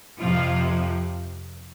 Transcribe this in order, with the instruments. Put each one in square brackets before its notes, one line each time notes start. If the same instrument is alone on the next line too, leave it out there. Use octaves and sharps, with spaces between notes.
[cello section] F2 C3 F3 F4